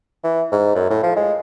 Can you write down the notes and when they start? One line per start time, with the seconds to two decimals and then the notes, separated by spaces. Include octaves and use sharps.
0.24 E3
0.52 G#2
0.75 F#2
0.90 A2
1.03 F3
1.16 G#3